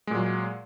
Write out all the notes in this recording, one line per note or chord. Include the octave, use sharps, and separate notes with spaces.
A#2 F#3 G#3